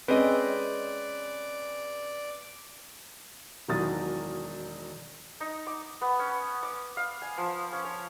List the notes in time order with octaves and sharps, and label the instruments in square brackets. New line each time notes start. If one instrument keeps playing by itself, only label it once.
[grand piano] G#3 C#4 G#4 [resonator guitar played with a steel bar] C4 D#5 [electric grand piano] B4 [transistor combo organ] D5
[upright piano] E1 D#3 E3 F#3 D#6 A6
[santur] D#4
D6
B3
C#4
D6
F5
G#5
F3
C#4
C#5